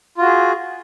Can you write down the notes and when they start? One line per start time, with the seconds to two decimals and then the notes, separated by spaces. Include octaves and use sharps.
0.18 F4
0.22 F#4
0.25 G#4